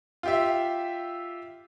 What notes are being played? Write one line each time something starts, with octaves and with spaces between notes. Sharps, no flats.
F4 G4 E5